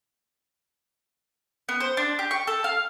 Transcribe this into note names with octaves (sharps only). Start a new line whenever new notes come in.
B3
C5
D4
G4
C#6
A4
F5